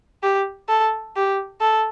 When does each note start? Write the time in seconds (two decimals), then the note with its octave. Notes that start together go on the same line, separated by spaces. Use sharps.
0.23 G4
0.69 A4
1.16 G4
1.61 A4